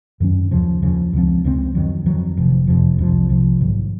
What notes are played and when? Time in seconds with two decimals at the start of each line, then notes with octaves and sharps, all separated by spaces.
0.20 F#2 D#3 F#3 C#4
0.51 D#2 C#3 F3
0.82 D#2 C#3 F3
1.13 C#2 C#3 F3 C4
1.44 C#2 C#3 F3 C4
1.75 F2 D#3 F#3
2.06 F2 D#3 F#3
2.37 F1 F2 C3 F3
2.67 F1 F2 C3 F3
2.99 C2 C3 F3
3.29 C2 C3 F3
3.60 A#1 G#2 D#3 F#3